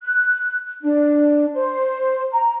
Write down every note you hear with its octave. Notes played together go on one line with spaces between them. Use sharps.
F#6
D4
C5
A#5